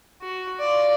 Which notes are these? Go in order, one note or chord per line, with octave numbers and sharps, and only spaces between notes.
F#4
F4 D5